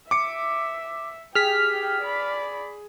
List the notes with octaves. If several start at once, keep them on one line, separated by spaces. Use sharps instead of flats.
E5 D6 C#7
G4 G#4 G5 F6 B6
D5 B5